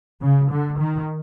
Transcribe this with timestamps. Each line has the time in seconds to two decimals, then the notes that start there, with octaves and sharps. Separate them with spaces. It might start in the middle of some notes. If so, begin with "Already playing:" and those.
0.22 C#3
0.51 D3
0.79 D#3